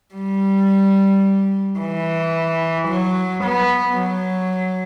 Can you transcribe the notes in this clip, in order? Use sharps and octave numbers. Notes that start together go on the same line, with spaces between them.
G3
E3
F#3
B3
F#3